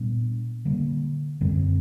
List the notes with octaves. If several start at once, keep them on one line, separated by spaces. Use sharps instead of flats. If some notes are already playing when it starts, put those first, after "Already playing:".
Already playing: A#2 G3 B3 D4
D3 G3 A#3
F#2 D3 G3 C4